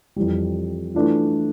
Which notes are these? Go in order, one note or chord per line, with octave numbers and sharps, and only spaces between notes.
F2 E3 G3
E3 A3 D4 F4